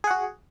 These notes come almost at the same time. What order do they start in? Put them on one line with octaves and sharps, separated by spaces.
G#4 F#5 F#4